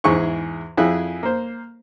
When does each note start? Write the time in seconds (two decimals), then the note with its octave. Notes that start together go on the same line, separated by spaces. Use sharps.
0.04 E2 G#2 E4 G#4 C#6
0.77 F2 E4 G#4 F#6
1.23 A#3 C5